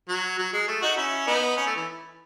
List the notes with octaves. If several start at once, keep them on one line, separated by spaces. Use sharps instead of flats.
F#3
F#3
G#3
A3
D#4 F#4
C#4 E4
B3 D#4
C#4
A3
E3